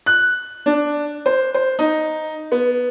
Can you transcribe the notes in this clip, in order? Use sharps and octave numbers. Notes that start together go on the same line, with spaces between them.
F#6
D4
C5
C5
D#4
B3